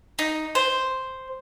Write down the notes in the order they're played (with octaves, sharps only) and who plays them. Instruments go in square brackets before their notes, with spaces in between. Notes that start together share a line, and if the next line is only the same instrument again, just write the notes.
[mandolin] D#4
C5